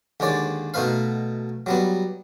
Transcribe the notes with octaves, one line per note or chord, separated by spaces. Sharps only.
D#2 D3 G#3 C#5 D5
B2 A3 D#4 B4 F5
F#3 G3 B3